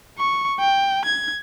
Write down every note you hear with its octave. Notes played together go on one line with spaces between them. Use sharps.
C#6
G5
G#6